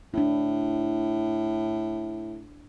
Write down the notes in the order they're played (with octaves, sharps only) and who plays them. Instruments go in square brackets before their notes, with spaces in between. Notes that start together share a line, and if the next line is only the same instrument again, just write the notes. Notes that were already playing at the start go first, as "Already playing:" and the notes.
[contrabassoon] A2 [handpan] D4 E4